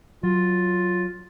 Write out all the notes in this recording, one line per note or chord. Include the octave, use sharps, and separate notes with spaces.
F#3 F4